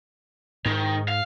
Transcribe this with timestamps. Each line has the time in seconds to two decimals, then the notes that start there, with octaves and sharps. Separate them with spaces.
0.66 G#2 D#3
1.08 F5